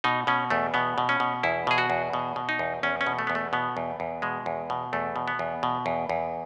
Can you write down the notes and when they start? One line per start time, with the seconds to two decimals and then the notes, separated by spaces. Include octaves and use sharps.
0.04 B2 D#4
0.27 B2 C#4
0.50 E2 A3
0.74 B2 B3
0.98 B2
1.09 C#4
1.20 B2
1.43 E2 E4
1.67 B2 G#4
1.78 F#4
1.90 E2
2.13 B2
2.36 B2
2.49 D#4
2.59 E2
2.83 E2 C#4
3.01 C#4
3.07 B2
3.19 A3
3.27 E2 B3
3.35 A3
3.53 B2 B3
3.77 E2
4.00 E2
4.22 B2 G#3
4.46 E2
4.70 B2
4.93 E2 A3
5.16 B2
5.28 B3
5.39 E2
5.63 B2
5.86 E2
6.09 E2